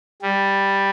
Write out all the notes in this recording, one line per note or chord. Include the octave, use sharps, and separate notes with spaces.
G3